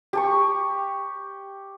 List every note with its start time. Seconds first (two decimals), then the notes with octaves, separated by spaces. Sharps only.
0.13 G4 A5 C#6